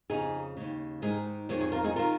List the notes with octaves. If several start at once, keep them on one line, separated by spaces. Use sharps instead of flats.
F2 C#3 D#4 G#4
D#2 C#3
G#2 D#3 D#4 G#4
F2 D#3 G#4 C#5
G#4 C#5
F4 A#4
D#4 G#4
D#3 F4 A#4